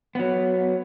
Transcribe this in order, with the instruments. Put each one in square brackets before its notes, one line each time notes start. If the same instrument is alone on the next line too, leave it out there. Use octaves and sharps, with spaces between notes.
[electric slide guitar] F#3 B3